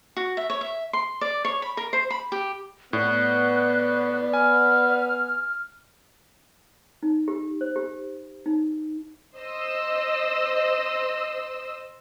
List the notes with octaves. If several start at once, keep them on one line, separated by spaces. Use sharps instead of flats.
F#4
E5
C#5
E5
C6
D5
C#5
B5
A#4
C5
B5
G4
A2 B3 D5 F#6
G#5 F6
D#4
G4
C5
G4
D#4
C5 D#5 E6